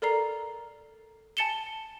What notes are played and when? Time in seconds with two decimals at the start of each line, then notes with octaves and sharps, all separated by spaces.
0.02 A4 A#4 D5 A#5 C7
1.37 G#5 A5 A6 C#7 E7 G7